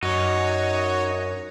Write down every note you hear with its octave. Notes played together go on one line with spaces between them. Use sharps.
F#2 D#4 F#4 C#5